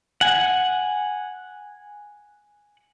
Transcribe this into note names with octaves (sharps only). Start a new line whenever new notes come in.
F#5 G#5